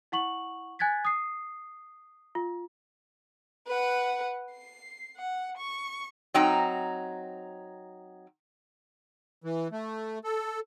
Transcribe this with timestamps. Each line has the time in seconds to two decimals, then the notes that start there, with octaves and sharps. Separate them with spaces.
0.12 E4 F#5 C#6 F#7
0.79 G#5 F#6 G#6 A6 B6
1.05 D#6 C7
2.35 F4
3.67 B4 F#5
4.51 C7
5.17 F#5
5.57 C#6
6.34 F#3 C4 D#4 G5 A#5
9.44 E3
9.72 A3
10.24 A4